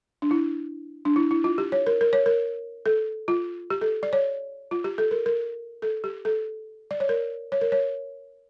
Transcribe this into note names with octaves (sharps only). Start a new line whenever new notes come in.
D4
E4
D4
E4
E4
F4
G4
C#5
A#4
A#4
C#5
A#4
A4
F4
G4
A4
D5
C#5
F4
G4
A4
A#4
A#4
A4
G4
A4
D5
C#5
A#4
C#5
A#4
C#5